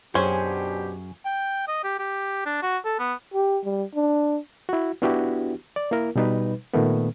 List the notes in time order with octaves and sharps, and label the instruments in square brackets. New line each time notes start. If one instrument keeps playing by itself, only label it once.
[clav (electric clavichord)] F#2 [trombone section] B2 D4 G4 [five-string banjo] C#4 G#4 [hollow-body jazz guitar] C5
[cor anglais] G5
D#5
G4
G4
D4
F#4
A4
B3
[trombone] G4
G3
D4
[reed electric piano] E4 F#4
B3 D4 E4 F#4 G4
D5
A#3 E4 A#4
B2 G3 D#4 B4
A#2 D#3 A3 B3